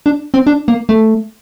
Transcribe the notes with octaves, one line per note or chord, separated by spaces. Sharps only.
D4
C4
D4
A#3
A3